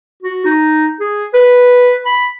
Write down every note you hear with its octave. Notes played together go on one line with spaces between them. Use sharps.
F#4
D#4
G#4
B4
B5